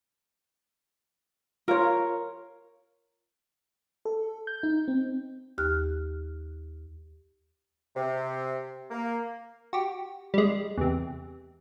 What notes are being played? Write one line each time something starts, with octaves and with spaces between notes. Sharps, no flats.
F4 A#4 C#5
A4
G6
D#4
C4
D#2 G4 F6 F#6
C3
A#3
F#4 G4
G3 G#3
E2 C3